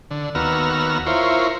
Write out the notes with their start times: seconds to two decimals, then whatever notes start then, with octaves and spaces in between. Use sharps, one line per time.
0.11 D3
0.35 D#2 B3 F#4 A#5 E6 F6
1.06 E4 F4 A#4 C5 C#5